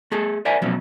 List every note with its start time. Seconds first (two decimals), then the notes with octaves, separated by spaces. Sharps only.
0.12 A3 G#4 A4
0.45 A#4 C5 D5 E5 F#5 G#5
0.62 B2 F3 F#3 A3 C#4